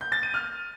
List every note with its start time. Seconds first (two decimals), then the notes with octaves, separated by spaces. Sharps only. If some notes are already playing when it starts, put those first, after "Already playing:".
0.01 G6
0.12 A6
0.23 D#7
0.34 F6